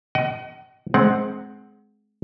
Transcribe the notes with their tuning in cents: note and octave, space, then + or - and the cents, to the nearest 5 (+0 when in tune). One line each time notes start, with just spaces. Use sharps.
D#5 +15 F#5 +45
G#3 +30 C4 +0 F#5 +10